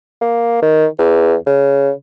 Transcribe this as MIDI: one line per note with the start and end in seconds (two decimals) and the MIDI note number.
0.21 0.60 58
0.63 0.86 51
0.99 1.35 40
1.46 1.91 49